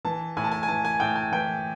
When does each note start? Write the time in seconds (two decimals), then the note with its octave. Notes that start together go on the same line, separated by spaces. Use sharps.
0.05 E3 A5
0.37 A2 G#5
0.44 A5
0.52 G#5
0.63 G#5
0.68 E3 A5
0.85 G#5
1.00 A2 G5
1.16 G#5
1.32 E3 G5